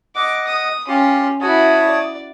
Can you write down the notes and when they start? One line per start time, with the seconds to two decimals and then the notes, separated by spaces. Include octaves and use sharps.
0.16 D#5 F#5 D6
0.47 D#6
0.88 C#4 F4 G4 C6
1.41 E4 F#4 C#5 A5 D#6
1.88 D5